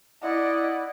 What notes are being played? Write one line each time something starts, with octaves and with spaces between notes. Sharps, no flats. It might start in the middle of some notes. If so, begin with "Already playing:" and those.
E4 D5 D#5 F#5